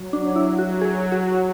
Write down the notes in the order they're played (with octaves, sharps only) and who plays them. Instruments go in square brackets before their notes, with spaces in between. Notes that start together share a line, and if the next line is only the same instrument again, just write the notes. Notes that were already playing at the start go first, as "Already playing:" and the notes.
Already playing: [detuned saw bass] F#3
[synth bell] D4
E4
F#4
G#4
F#4